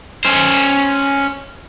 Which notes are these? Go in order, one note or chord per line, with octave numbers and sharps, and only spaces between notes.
C#4 C5